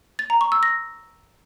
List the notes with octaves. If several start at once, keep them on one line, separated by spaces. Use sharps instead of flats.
A6
A#5
C#6
E6
A#6